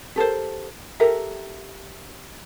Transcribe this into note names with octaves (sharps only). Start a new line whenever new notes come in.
G4 A4 A#4 C5
G4 A4 A#4 E5